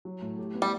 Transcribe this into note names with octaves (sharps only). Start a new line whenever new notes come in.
F#3
A2
G4
B3
G3